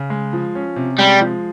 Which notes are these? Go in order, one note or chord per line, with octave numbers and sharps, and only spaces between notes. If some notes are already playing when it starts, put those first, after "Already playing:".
Already playing: C#3
G#3
F3
C#4
C3
G3 G#3
F3